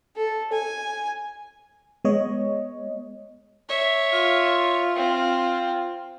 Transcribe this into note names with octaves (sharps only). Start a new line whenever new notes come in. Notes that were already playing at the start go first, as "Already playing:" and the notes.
A4
G#5
G#3 B3 C#5 D#5
C#5 E5
F4
C4